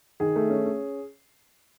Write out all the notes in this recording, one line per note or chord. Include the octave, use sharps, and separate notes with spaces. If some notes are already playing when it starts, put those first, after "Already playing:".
D#3 G#4
A3
C#4
C#4